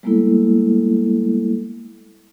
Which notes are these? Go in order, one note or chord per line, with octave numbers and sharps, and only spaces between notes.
G3 G#3 A#3 B3 E4 A4